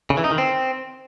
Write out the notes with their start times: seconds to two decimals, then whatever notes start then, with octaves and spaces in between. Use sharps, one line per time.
0.10 C#3
0.17 E3
0.24 D#4
0.31 D#3
0.38 C4